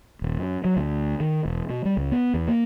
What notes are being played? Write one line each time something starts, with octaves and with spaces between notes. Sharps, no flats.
D#1
F#2
F#3
D2
D#3
E1
B2
G3
C#2
B3
E2
A#3